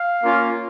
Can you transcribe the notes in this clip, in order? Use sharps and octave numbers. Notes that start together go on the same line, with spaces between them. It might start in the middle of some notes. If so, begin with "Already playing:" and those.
Already playing: F5
A#3 C#4 F4